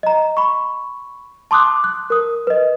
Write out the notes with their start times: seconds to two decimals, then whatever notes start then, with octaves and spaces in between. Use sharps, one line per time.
0.03 D#5 A#5
0.37 B5 C#6
1.51 A5 C6 D6 D#6 F#6
1.84 F#6
2.10 A#4 D#6
2.47 B4 D#5